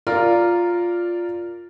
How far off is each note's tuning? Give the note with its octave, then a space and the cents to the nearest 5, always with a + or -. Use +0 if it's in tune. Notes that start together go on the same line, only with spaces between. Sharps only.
F4 +0 A#4 -5 D5 -5